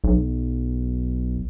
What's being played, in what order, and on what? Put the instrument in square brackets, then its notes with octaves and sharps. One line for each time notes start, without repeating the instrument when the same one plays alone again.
[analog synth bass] B1